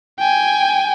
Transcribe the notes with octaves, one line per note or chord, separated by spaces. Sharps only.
G5 G#5